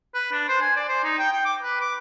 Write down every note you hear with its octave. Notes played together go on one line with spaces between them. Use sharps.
B4
D4
C5
G#5
D5
C5
D#4
G5
G5
D6
B4
D6